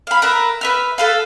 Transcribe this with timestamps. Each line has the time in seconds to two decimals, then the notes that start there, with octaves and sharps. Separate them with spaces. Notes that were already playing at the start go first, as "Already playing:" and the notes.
0.07 F5 B5
0.22 A#4 B4 E5
0.61 B4 E5 F6
0.98 A4 B4 F5